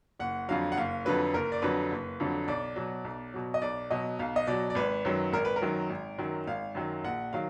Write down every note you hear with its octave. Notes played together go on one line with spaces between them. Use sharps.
F#1 F#5
F2 D3 F#3 F5
F#5
F#1 F5
F2 D3 F#3 B4
F#1 A#4
D5
F2 D3 F#3 B4
F#1
F2 D3 F#3
B1 D5
B2 F#3
B1
B2 F#3
D#5
B1 D5
B2 F#3 D#5
B1 F5
D#5
B2 F#3 D5
D5
G#1 B4
F#2 D#3 F#3
G#1 A#4
B4
A#4
F#2 D#3 F#3
G#1
F#2 D#3 F#3
G#1 F5
F#2 D#3 F#3
A#1 F#5
D#3 F#3 F5